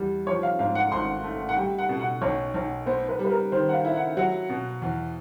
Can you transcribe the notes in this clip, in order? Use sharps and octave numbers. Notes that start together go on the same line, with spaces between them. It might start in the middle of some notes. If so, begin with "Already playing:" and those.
Already playing: E2 G3
F3 C#5
F5
G#2 F5
F#5
G#1 C6
A3
F#5
G3 G5
F#5
B2
F#5
B1 C#5
B1
B3 C5
B4
G3
B4
A#4
D#3 C5
F#5
F5
E4
F#5
F#3 F#5
B2
E2